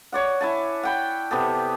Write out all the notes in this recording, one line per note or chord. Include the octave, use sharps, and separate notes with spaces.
C#5 D5 F#5
E4 G#5 A5
F#5 G5 B5
C3 B3 G4 A4